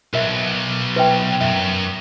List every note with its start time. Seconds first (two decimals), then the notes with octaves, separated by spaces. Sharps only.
0.14 B1 A#4 E5
0.96 B4 E5 G5
1.41 F#2 E5